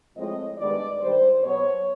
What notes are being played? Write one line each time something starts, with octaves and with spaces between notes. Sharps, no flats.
A2 F3 G#3 C4 D#5
G2 D#3 G#3 B3 D5
G2 D#3 G3 C5
B2 F#3 B3 C#5